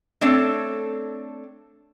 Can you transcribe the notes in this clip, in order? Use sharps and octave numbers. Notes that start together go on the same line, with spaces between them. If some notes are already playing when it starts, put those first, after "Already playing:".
A3 C4 D4 A4 C#5